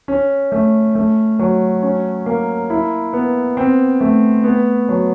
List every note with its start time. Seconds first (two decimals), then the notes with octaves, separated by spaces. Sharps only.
0.08 C#4
0.52 A3
0.95 A3
1.39 F#3
1.83 C#4
2.26 A#3
2.70 E4
3.13 B3
3.57 C4
4.01 A3
4.44 B3
4.89 F#3